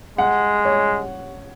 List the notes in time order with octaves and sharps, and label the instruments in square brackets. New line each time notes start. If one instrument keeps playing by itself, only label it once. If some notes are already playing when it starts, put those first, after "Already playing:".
[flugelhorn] G#3 [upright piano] F#5
[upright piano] C#5